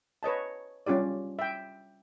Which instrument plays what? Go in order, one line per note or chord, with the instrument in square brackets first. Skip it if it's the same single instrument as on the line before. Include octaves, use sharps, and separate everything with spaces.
[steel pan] B4 C#5 D#5 A5
G3 C#4 F4 G4 D5
E5 G5